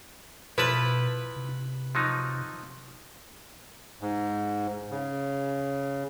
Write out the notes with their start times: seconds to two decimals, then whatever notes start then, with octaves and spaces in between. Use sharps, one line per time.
0.58 B2 F3 E4 B4 A5
1.36 C3
1.95 F3 F#3 D#4
4.01 G#2
4.91 C#3